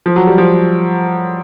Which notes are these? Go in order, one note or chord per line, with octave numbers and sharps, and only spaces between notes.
F3
F#3
G3
F3